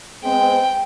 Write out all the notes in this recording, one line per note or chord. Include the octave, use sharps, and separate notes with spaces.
G#3 B3 C4 G5